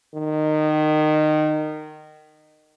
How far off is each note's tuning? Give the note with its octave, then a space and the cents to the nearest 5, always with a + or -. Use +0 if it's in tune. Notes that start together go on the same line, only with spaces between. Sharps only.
D#3 -20